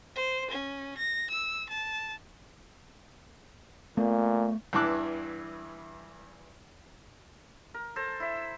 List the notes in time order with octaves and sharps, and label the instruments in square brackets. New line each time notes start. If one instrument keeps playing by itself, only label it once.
[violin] C5
C#4
A#6
E6
A5
[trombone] A#2 [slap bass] A3 B3
[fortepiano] E2 G2 E3 A5 D6 F#6
[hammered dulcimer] A#4
A4 C5 A5 A#5
E4 E5